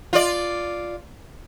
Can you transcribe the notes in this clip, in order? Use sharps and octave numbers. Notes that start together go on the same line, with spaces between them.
F4 D5